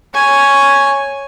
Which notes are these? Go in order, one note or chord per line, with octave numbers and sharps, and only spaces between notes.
C#5 G#5